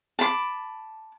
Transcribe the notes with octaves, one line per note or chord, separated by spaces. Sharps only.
A5 B5 C6 D6